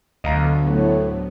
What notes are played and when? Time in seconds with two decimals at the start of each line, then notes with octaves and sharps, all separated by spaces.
0.24 D2 D3 F#3 B3 D#5 F5 A#5
0.68 A2 F#4